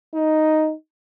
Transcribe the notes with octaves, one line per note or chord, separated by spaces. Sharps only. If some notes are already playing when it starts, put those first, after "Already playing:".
D#4